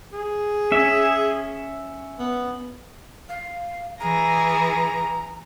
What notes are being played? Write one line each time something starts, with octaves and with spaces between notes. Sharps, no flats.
G#4
C#4 E5
B3
F5
E3 G#4 A#5 A#6